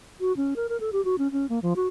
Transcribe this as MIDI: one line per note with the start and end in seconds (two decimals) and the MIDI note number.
0.20 0.35 66
0.37 0.54 61
0.56 0.67 70
0.69 0.77 70
0.80 0.90 69
0.93 1.04 67
1.05 1.16 66
1.18 1.31 61
1.32 1.49 61
1.49 1.60 58
1.62 1.73 53
1.76 1.88 66